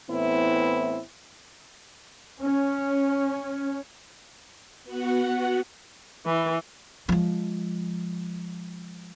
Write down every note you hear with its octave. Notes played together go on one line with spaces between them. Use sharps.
A2 E3 B3 C4 E4
C#4
B3 F#4 F#5
E3
F3 G#3